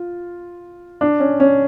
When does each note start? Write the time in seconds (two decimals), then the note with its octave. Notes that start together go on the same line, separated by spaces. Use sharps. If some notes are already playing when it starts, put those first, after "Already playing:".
Already playing: F4
1.01 D4
1.20 C#4
1.40 C#4